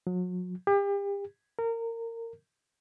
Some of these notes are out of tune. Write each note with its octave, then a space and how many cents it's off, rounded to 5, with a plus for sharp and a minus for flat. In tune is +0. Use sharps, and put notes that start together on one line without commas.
F#3 -35
G4 +35
A#4 -25